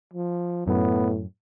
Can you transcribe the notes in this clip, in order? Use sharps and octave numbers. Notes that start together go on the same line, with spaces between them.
F3
F#2 A2 B3